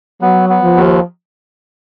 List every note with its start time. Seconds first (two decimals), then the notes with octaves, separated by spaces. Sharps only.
0.21 F#3 B3
0.50 B3
0.63 F3
0.76 D#2